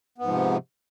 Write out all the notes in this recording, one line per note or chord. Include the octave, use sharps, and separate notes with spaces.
G#2 C3 F3 B3